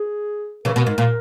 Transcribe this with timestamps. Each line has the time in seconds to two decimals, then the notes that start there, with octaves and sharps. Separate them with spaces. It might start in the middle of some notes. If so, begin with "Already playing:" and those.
Already playing: G#4
0.65 C#3 E3 A#4
0.76 B2
0.87 G#2
0.98 A#2